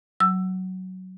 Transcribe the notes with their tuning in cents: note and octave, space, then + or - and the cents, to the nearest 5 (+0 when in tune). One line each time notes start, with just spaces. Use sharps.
F#3 +10 E6 +10